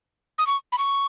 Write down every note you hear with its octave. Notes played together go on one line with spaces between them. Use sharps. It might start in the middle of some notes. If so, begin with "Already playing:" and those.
D#6
C#6
B5
C#6